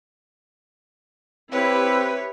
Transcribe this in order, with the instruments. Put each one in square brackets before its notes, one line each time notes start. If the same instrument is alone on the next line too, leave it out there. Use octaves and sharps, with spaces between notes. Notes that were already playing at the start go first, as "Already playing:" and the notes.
[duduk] C4 [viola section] E4 G4 [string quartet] B4 [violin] C#5